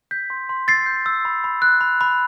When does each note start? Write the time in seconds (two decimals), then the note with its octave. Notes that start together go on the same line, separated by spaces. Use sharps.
0.11 G6 B6
0.30 C6
0.49 C6
0.68 E6 A6 C7
0.86 G6
1.06 E6
1.25 B5
1.44 B5
1.62 F#6
1.81 B5
2.01 B5